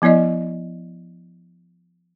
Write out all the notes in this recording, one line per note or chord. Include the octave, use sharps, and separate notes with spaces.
F3 B3 E4 D5 D#5